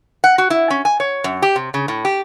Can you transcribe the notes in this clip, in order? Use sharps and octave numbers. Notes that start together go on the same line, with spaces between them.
F#5
F#4
E4
C#4
G#5
C#5
F#2
G4
C3
C#3
A2
G4